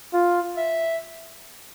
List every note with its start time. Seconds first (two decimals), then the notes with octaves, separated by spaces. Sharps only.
0.13 F4
0.57 E5